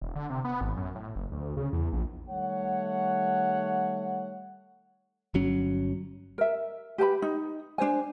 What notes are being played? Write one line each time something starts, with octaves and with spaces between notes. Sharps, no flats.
E1
D3
C3
B3
G#1
F#2
A2
F#1
D2
C#3
E2
A#1
D#3 G3 A3 C#5 F#5
G1 F#3 C#4
A#4 E5
G4 B4 A5 B5
D#4
D4 G#4 C5 G#5